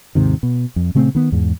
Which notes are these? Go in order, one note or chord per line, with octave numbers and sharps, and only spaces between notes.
D#2 G#2 C3 D#3
B2
F2
A#2 C#3 A3 C4
D#3 B3
E2 G#2